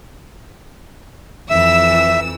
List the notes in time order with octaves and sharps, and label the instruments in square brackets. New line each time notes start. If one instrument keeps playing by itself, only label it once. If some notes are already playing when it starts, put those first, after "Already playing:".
[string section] F2 E3 E6 [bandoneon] E5